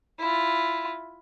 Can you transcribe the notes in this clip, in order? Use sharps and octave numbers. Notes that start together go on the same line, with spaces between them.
E4 F4